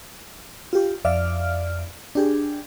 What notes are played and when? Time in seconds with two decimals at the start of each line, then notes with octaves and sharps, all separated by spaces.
0.73 F4 G4
1.05 F2 D5 E5 F5 F6
2.15 D4 G4 G#4